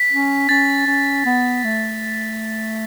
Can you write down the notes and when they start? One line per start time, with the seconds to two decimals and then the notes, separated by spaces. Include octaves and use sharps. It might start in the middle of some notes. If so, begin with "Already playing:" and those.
Already playing: B6
0.10 C#4
0.49 C#4 A6
0.87 C#4
1.26 B3
1.64 A3